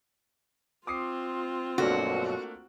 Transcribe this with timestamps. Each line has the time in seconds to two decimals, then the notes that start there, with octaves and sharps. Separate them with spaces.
0.87 C4 F4 D6 D#6 C7
1.78 G2 B2 F#3 A3 A#3 D4 F#4